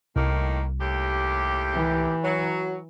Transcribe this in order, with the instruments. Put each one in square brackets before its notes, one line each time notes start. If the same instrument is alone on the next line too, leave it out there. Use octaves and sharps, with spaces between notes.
[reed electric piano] C2 [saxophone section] A2 D#3 A#3
[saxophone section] D#2 A2 G4
[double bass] E3
[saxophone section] F#3